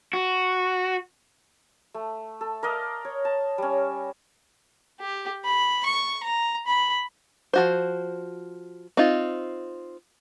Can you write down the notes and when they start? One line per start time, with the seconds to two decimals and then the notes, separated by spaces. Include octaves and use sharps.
0.13 F#4
1.94 A3
2.41 A4
2.63 A#4 D5 D#5 F5
3.05 C#5
3.25 A5
3.58 G3 C#4
5.00 G4
5.44 B5
5.86 C#6
6.23 A#5
6.67 B5
7.53 F3 F#4 C5
8.97 C4 D#4 F4